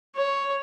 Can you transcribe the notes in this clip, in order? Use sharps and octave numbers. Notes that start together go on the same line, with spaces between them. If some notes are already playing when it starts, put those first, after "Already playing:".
C#5